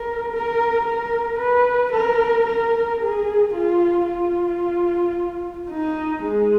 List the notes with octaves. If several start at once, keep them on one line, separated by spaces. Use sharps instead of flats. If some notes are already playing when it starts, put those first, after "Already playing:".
Already playing: A#4
A#4
A#4
B4
A#4
A#4
G#4
F4
F4
D#4
G#3